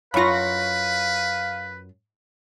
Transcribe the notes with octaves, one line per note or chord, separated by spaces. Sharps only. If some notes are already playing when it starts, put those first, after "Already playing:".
F#2 F4 B4 F5 B5 C#6 A#6